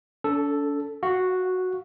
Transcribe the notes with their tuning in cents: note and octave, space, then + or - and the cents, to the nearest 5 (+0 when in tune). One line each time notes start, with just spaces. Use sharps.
D4 -45 A4 +0
F#4 -5 F5 +0